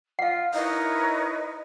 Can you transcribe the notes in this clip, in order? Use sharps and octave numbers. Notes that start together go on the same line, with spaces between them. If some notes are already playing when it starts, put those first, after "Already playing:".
F4 F5 F#5
D#4 E4 A#4 B4 C#5 D#5